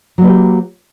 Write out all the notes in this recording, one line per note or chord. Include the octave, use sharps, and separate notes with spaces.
F#3 A#3 G4 B4